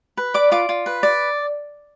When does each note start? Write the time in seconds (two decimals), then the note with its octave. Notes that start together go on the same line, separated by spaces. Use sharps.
0.17 B4
0.34 D5 D6
0.52 F4 D6
0.69 F4
0.86 B4
1.03 D5